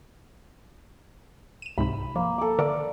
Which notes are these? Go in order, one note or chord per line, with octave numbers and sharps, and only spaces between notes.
D#7 E7
C#2 G#2 C3 B5
F3 A#3
A4 D6
D3 A4 A#4 D5 D6